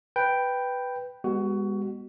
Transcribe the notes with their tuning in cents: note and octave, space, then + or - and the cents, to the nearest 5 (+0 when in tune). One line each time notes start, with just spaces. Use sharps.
B4 +0 G5 +0
G#3 -40 B3 -15 F#4 +20